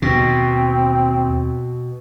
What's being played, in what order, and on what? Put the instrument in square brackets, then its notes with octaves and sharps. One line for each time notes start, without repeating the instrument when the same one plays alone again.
[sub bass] D#2 [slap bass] B2 [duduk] C4